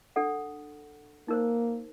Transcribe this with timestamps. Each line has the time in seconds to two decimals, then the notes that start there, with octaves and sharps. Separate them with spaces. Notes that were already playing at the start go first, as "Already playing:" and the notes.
0.16 D4 A4 F#5
1.28 A#3 D#4 A#4 C5